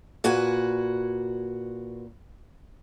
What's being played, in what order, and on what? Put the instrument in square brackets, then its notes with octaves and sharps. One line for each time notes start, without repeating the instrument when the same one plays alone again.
[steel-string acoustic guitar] A#2 F#4 B4 G#5